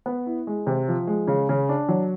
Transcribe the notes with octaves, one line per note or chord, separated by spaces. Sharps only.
B3
E4
G#3
C3
F3
G#3
C#3
C#3
D4
F#3